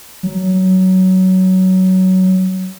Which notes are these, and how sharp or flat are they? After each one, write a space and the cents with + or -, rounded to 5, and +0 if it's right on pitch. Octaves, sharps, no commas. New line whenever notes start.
F#3 +15